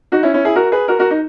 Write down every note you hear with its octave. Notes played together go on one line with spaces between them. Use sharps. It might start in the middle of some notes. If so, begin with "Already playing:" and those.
D#4 F#4
C#4 E4
C#4 E4
E4 G#4
F#4 A#4
G#4 B4
F#4 A#4
F#4 A#4
D#4